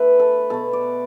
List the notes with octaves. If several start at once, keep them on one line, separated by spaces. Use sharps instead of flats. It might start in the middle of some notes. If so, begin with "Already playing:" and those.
Already playing: D3 A3 B4 E5
A4
B2 A3 A4
D5